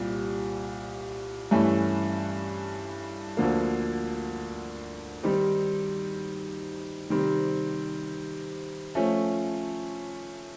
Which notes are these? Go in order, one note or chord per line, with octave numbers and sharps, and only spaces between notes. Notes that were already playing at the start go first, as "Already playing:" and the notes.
Already playing: C2 A#2 G3
G2 E3 A3 C#4 E4
D2 D3 F3 A#3
D#3 G3 C4 D#4 G4
C3 D#3 G3 C4
F3 A3 C#4